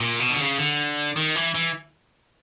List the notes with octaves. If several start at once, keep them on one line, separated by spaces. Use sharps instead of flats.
A#2
B2
D3
C#3
D3
D#3
E3
E3